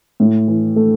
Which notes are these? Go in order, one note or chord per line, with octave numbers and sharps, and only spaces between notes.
A2
E3
A3